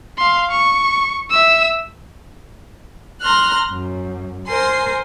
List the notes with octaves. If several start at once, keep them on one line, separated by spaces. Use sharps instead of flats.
F5 C6
C#6
E5 E6
A#5 C6 F6 F#6
F#2
A#4 C5 G#5 C6